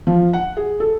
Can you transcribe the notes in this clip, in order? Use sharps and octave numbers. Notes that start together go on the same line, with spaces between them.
F3
F#5
G#4
A4